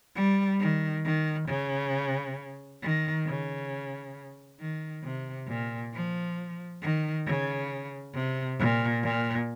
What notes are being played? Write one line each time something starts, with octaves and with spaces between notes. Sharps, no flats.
G3
D#3
D#3
C#3
D#3
C#3
D#3
C3
A#2
F3
D#3
C#3
C3
A#2
A#2